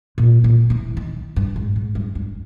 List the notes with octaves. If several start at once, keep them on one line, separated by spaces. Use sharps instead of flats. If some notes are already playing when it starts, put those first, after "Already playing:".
A#2
A#2
E3
D#3
G2
G#2
G#2
G2
G2